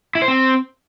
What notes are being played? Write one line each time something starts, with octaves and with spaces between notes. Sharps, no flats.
E4
C5
C4